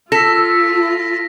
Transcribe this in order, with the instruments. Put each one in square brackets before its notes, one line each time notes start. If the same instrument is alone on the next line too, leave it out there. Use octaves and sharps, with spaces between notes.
[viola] F4 [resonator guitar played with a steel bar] A4 [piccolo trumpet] E6 [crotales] A#6 B6